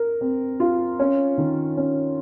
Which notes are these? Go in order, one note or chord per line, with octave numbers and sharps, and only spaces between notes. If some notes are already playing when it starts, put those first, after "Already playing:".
Already playing: A#4
C4
F4
C#4
D#3
C#4